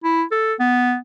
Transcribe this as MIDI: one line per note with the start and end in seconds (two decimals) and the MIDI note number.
0.04 0.23 64
0.31 0.54 69
0.59 0.96 59